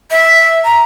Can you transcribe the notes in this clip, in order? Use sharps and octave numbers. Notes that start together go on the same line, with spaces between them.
E5
A#5